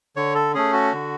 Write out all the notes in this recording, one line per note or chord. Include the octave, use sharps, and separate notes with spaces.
D3 C#5
A4
A3 C#4 G#4
F#4
D3